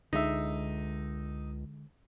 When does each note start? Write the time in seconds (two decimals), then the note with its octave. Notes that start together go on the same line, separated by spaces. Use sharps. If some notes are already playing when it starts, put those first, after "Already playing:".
0.13 C#2 D3 G#3 D#4 E5